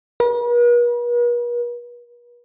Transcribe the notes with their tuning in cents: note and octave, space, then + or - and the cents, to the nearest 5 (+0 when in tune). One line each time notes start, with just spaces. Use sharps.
B4 -45